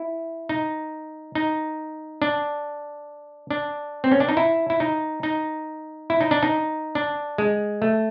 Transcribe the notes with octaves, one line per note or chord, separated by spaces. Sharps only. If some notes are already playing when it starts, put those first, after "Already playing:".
Already playing: E4
D#4
D#4
D4
D4
C4
C#4
D4
D#4
E4
E4
D#4
D#4
E4
D#4
D4
D#4
D4
G#3
A3